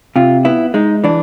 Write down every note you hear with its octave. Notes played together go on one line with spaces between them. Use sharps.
C3 F4
B3 E4
G#3 D#4
E3 D4